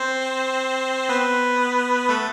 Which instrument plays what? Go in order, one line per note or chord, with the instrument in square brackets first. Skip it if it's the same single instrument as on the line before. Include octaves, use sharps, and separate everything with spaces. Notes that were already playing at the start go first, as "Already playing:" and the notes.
Already playing: [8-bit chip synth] C4 C5
B3 B4
A3 A4